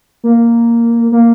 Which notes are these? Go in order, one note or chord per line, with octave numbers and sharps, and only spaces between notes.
A#3
A#3